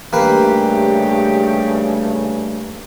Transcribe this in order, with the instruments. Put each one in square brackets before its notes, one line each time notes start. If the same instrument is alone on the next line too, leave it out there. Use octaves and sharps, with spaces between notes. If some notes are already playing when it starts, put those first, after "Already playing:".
[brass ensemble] G2 C#3 A3 [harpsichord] A#3 B4 [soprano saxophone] G4